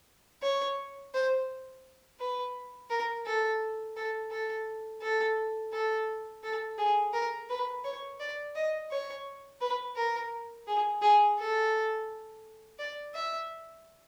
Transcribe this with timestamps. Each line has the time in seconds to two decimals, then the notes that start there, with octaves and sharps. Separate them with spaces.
0.42 C#5
1.14 C5
2.19 B4
2.90 A#4
3.26 A4
3.96 A4
4.31 A4
5.01 A4
5.73 A4
6.44 A4
6.78 G#4
7.13 A#4
7.50 B4
7.84 C#5
8.20 D5
8.55 D#5
8.91 C#5
9.61 B4
9.96 A#4
10.67 G#4
11.02 G#4
11.38 A4
12.79 D5
13.14 E5